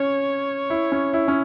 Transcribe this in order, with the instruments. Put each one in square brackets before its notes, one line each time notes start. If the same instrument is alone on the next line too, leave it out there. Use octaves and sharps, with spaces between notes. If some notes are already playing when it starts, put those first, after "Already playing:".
Already playing: [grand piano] C#4 [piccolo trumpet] C#5
[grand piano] E4
C#4
E4
C#4